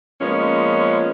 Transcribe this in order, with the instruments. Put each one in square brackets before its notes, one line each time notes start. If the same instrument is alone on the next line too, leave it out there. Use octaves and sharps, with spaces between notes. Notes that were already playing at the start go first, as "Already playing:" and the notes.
[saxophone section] A#2 F3 G#3 B3 C#4